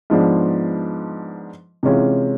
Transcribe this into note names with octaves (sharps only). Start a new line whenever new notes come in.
G#2 F3 G#3 B3 D4
C3 E3 G#3 C#4 F4